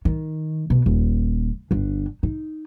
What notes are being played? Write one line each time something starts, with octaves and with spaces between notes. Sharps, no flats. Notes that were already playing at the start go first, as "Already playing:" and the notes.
D#3
B2
D#1
G1 D3
D#4